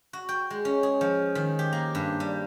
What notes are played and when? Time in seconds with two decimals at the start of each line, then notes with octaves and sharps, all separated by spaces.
0.13 F#4
0.29 G5
0.50 G#3
0.65 C#4
0.83 G#4
1.01 F3
1.35 D#3
1.59 G4
1.73 A#3
1.95 G2
2.20 G3